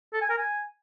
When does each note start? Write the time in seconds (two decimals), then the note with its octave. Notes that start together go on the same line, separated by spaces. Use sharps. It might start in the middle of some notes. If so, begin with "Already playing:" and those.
0.13 A4
0.22 G#5
0.30 A#4
0.38 G#5